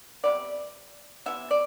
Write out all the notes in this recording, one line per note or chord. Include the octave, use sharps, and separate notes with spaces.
C3 G3 B3 D5
C3 E3 B3 E5
D5